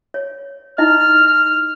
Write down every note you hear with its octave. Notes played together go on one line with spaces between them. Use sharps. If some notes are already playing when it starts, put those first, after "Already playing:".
C#5
D#4 E4 D#5 F6
F6